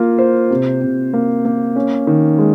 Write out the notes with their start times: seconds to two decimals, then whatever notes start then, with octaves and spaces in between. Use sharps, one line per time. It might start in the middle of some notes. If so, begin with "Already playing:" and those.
Already playing: A#3 F4
0.18 C5
0.51 C3
0.82 C3
1.13 A#3
1.45 A#3
1.76 C#4
2.07 D#3
2.39 G#3